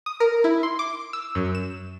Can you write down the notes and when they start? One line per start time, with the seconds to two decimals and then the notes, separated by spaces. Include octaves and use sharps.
0.06 D#6
0.20 A#4
0.44 E4
0.63 C6
0.79 D6
1.13 E6
1.35 F#2
1.55 E7